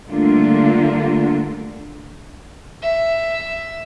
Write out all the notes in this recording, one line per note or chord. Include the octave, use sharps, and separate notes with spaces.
D3 G3 A3 A#3 D4 F4
E5